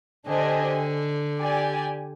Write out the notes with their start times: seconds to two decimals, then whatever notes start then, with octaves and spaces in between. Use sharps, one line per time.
0.27 D3 D4 G4 C5 D#5 G#5
1.39 G4 D5 G#5